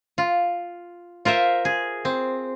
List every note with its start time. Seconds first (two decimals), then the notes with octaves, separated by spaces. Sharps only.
0.18 F4
1.25 F4 A#4 C5 E5
1.65 G#4
2.05 C4